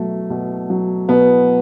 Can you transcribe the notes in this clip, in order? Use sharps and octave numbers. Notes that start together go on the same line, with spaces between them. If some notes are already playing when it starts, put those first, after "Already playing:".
Already playing: B2 F#3 A3
B2
F#3
B2 B3